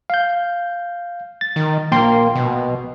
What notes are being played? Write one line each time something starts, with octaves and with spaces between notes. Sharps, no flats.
F5 G6
A6
D#3
A#1 A#3 G5 C6
B2